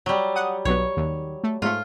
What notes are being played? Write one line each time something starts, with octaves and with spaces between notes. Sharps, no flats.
F#3 G3
F#5 D#6
B1 F#3 B3 C#5
D#2
A3
G#2 A3 F4